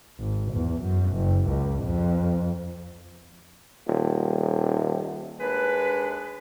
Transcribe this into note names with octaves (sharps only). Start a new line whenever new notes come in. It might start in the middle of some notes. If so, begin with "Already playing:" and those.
G#1
E2
F#2
F#1
C#2
F2
D#1
D#2 G#3 D4 B4